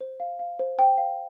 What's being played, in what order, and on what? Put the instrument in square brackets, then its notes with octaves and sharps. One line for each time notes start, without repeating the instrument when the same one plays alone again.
[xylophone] C5
F5
F5
C5
C5 G5
F5